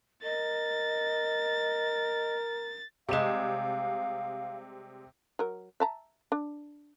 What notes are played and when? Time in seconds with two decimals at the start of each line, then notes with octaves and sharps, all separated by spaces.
0.23 A#4 D#5 A6
3.09 C3 G3 G#3 F5 E7
5.39 F#3 A#4
5.80 E5 A5 A#5
6.32 D4